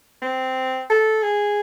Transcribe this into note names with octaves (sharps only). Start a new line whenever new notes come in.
C4
A4
G#4